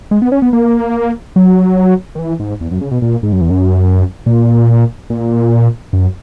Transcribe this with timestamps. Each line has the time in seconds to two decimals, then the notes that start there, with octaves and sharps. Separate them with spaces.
0.11 G#3
0.22 B3
0.32 C#4
0.42 B3
0.53 A#3
1.36 F#3
2.15 D#3
2.19 E3
2.40 G#2
2.61 E2
2.71 F#2
2.81 C#3
2.91 B2
3.02 A#2
3.23 G#2
3.32 F#2
3.41 E2
3.50 F#2
4.26 A#2
5.10 A#2
5.93 F#2